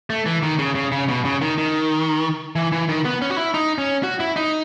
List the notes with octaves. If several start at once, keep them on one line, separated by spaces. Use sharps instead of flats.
A3
E3
D#3
C#3
C#3
C#3
B2
C#3
D#3
D#3
E3
E3
D#3
B3
C#4
F#4
E4
D#4
C#4
F#4
E4
D#4